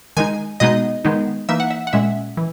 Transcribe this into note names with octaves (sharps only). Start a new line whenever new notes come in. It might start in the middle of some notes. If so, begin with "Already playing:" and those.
D#3 G#3 D#4 G#5
B2 G#3 B3 D#4 D#5
D#3 G#3 B3 D#4
E3 A#3 D#4 E5
F#5
E5
F#5
A#2 G#3 C#4 E5
E3